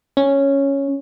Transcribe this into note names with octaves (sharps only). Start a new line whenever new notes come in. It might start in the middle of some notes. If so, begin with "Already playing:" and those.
C#4